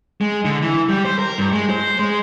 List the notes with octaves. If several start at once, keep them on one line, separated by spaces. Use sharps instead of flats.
G#3
D3
E3
G3
C5
A#4
G2
G#3
C5
G#3